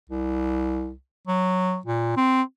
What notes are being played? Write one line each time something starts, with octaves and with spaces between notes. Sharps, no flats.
C2
F#3
A#2
C4